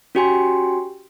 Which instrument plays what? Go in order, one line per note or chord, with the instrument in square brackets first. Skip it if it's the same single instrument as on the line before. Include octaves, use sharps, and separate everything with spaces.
[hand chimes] C#4 F#4 G4 G5 G#5 C6